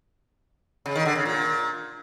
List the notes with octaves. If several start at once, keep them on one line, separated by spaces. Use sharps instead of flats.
C#3
D#3
D3
C#3
A#2